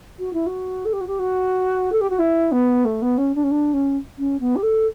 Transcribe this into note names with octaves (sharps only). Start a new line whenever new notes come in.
F#4
E4
F#4
A4
G4
F#4
G4
F#4
A4
G4
F#4
E4
B3
A3
B3
C#4
D4
C#4
D4
C#4
C#4
B3
G4
A4